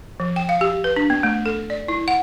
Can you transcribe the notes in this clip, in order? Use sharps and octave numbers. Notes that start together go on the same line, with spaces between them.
F3
G5
F5
G4
B4
D4
B3
A3
A4
D5
E4
F#5